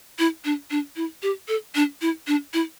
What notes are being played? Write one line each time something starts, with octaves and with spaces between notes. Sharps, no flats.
E4
D4
D4
E4
G4
A4
D4
E4
D4
E4